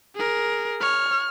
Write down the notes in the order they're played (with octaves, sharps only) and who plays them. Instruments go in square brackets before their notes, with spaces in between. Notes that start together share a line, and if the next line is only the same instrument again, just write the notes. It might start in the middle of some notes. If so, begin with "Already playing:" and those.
[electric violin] G#4 A#4
[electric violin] C#5 [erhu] F6